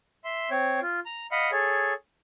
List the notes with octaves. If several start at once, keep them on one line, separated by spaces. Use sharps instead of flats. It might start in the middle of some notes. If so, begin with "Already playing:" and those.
E5 C6
C4 C#5
F4
A#5
D#5 F5 F#5 B5
G#4 A4 C#5